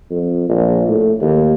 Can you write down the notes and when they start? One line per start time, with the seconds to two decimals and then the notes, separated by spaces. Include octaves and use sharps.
0.10 F2
0.49 A#1
0.88 A2
1.21 D#2